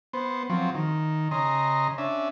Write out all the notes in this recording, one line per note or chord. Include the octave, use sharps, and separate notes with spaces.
B3 C5
F3 F#3 C4
D#3
C#3 D#5 A#5 C6
C#4 D4 E5